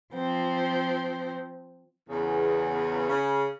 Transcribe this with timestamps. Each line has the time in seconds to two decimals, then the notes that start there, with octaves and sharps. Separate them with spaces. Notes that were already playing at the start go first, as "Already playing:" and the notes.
0.14 F3 C4
2.08 E2 C#3
3.07 C#3